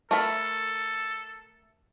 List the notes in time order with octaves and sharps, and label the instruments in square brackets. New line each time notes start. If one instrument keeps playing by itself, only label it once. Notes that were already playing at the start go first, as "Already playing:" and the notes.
[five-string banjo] A3 A#4 B5 [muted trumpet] A4